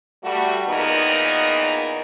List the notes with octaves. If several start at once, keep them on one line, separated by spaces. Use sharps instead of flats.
G3 A3 F#4
E2 A#2 D#3 B3 D#4 A#4